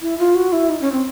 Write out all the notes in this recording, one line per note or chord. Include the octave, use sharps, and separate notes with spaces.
E4
F4
F#4
E4
D#4
C#4
C4